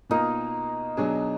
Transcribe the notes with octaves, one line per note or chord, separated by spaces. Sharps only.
B2 A#3 D#4 F4 A#4
B2 F#3 D4 G#4